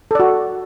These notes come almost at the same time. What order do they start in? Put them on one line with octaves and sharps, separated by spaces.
A4 D5 F#4